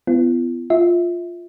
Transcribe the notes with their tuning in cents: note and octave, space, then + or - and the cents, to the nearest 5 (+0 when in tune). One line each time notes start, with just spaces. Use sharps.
B3 +30 F4 -45
F4 +0 E5 -20